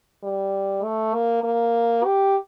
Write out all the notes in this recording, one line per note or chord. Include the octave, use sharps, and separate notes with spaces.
G3
A3
A#3
A#3
G4